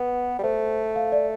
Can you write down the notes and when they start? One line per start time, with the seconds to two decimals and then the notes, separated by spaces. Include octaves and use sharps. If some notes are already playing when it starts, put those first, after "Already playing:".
Already playing: B3 B4
0.39 G3
0.43 A3 C5
0.96 F5
1.12 D5